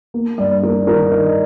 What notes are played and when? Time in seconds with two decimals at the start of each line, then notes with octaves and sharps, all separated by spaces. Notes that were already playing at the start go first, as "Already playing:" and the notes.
0.14 A#3
0.38 G2 D5
0.62 A#3 A#4
0.87 D#3 A#4
1.11 D#3 D#4